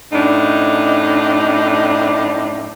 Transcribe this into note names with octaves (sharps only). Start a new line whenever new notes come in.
F#2 A2 D4 D#4